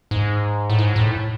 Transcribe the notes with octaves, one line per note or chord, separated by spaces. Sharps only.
G#2
A2
G#2
A2